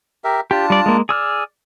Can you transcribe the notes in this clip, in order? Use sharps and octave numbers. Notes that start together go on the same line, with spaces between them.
G4 A#4 E5
D4 F4 G4 A5
G3 D5
G#3 A#3
G#4 D5 E6 F6